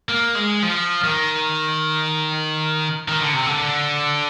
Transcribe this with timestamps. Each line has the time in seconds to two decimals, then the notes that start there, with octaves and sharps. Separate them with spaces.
0.09 A#3
0.35 G#3
0.63 F3
1.04 D#3
3.08 D#3
3.21 D3
3.33 C3
3.46 D3